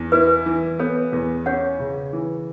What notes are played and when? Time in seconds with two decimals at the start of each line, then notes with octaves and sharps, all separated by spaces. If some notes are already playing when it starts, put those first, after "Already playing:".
Already playing: E2
0.12 E4 B4
0.46 E3
0.79 B3 A4 C#5
1.13 E2
1.46 C#4 C#5 F#5
1.80 C#3
2.13 E3